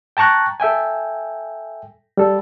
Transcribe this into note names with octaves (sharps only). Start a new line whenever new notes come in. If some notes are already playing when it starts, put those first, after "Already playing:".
G5 A5 A#5 C#6 F#6
A4 E5 G5 G#5
G3 A4